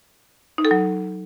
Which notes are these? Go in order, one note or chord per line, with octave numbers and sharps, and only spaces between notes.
D#4
A4
F#3